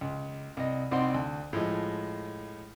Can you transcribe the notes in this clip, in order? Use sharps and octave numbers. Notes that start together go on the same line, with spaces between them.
C#2
C2 D#5
C2 C4 D#4 D5 F#5 C6
D2
A2 F3 G#3